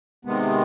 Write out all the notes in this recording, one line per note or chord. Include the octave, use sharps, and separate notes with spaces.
C3 D#3 G#3 B3